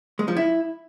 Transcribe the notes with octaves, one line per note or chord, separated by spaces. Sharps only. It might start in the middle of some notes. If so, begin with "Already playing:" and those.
G#3
F3
E4